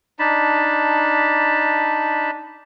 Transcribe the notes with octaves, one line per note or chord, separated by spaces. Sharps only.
D4 D#4 A5 B5